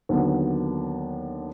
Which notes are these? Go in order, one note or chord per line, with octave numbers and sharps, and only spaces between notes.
D#2 D3 F#3 B3